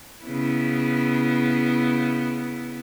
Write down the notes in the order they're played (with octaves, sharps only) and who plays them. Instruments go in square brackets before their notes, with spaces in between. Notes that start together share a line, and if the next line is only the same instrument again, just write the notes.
[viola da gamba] C#3 B3 E4